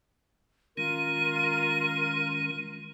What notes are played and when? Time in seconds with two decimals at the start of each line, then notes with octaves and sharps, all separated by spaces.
0.77 D#3 G#3 C#4 F4 A#4 C6 D#7